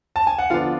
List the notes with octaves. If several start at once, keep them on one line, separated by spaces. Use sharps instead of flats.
A5
G#5
F#5
D3 F3 B3 D4 F4 F5